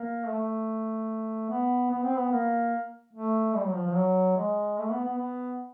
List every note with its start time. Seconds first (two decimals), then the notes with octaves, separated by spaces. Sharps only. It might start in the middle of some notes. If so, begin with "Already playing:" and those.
Already playing: A#3
0.27 A3
1.50 B3
1.91 B3
2.03 C4
2.16 B3
2.32 A#3
3.13 A3
3.55 G3
3.65 F#3
3.75 F3
3.86 F3
3.95 F#3
4.37 G#3
4.78 A3
4.92 B3
5.04 B3
5.18 B3